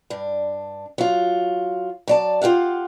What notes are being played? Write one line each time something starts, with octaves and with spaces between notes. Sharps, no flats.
G2 D4
F#3 F4
F#3 D5 A5
F4 G4 F5 F#5